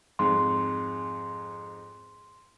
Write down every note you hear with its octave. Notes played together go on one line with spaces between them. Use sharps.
F2 G#2 G#3 C6